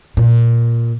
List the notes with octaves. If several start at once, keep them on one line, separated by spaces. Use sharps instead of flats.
A#2